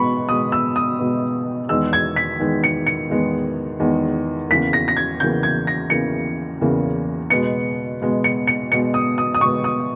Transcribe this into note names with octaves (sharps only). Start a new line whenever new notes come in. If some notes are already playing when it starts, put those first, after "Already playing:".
Already playing: B2 G#3 B3 B5 C#6
B2 G#3 B3 D#6
E6
D#6
B2 G#3 B3
E2 D#3 G#3 B3 E6
G#6
B6
E2 D#3 G#3 B3
C#7
C#7
E2 D#3 G#3 B3
E2 D#3 G#3 B3
E2 C#3 E3 A#3 B6
A#6
A#6
G#6
E2 C#3 E3 A#3 G6
G#6
A#6
E2 C#3 E3 A#3 C#7
E2 C#3 E3 A#3
B2 G#3 B3 C#7
B2 G#3 B3
C#7
C#7
B2 G#3 B3 C#7
D#6
D#6
D#6
B2 G#3 B3 C#6
D#6